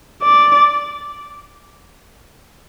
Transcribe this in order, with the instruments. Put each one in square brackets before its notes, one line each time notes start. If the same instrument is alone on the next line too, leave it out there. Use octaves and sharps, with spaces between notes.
[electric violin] D5